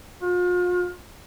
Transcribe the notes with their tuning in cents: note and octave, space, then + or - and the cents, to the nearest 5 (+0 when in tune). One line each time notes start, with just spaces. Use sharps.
F4 +40